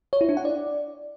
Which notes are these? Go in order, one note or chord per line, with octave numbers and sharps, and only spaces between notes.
C#5
E4
D4
F#5
D5